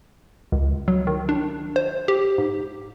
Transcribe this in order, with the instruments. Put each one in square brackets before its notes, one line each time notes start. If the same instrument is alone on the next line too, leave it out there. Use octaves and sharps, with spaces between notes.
[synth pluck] C#2
F#3
D#3
D4
C5
G4
G#2